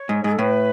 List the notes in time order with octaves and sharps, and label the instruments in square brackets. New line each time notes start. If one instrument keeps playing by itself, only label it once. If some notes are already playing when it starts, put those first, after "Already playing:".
Already playing: [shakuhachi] C#5
[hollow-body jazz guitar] G#2
[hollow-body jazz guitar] G#2 [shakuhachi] G#4
[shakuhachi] A4
[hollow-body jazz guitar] A2 [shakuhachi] B4